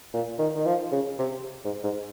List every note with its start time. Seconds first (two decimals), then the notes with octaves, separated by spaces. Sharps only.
0.14 A#2
0.39 D#3
0.55 D#3
0.66 F3
0.92 C#3
1.19 C3
1.65 G#2
1.84 G#2